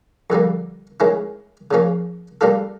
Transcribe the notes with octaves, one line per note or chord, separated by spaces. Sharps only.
F2 D3 G3 A#3
D#3 G#3 C#4 E4
C#3 F3 A#3 C#4
G3 A#3 D4 F4 A4